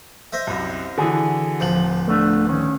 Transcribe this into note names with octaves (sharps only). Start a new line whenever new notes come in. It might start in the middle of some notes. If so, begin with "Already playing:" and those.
C5 D#5 E5
C2 F#2
D3 E3 F#4 G#4
D1 D2 F3 F#7
A3 B3 D4
D#3 C#4